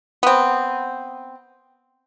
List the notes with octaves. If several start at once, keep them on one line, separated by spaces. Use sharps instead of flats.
B3 C4